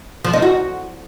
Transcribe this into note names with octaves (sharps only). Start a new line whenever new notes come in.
F3
D#4
F#4